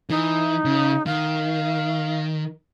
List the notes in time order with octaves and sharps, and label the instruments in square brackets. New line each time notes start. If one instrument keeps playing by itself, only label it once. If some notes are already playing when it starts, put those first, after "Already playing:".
[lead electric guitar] E3 [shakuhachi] D#4
[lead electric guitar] C#3
[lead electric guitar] D#3 [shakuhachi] F5